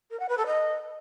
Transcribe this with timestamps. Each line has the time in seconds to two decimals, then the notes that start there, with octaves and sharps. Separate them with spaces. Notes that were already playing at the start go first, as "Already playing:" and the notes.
0.11 A#4
0.20 F#5
0.29 B4
0.38 A4
0.47 D#5